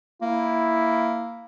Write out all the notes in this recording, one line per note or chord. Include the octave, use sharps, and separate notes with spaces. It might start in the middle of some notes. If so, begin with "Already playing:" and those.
A#3 E4